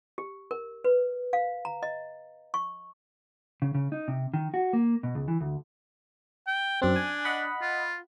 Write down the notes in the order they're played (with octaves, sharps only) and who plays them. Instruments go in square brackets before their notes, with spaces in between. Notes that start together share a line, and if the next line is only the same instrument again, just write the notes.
[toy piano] G4
A#4
B4
F5
A#5
D#5
C#6
[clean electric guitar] C#3
C#3
D#4
C3
D#3
F#4
A#3
B2
C#2
E3
D2
[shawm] G5
[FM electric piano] F#2 C4 [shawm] D4
[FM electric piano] G#5
D#5 F#5 B5
[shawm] F4